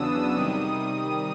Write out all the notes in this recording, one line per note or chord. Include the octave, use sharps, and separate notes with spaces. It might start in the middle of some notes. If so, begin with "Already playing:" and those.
Already playing: E2 C#3 F#3 B3 D4 D#6 E6
C3 D#3 G3